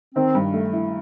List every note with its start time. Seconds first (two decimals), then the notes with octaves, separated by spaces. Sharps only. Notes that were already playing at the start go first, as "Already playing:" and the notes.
0.15 D#3 C4
0.35 G2
0.54 A3
0.73 E4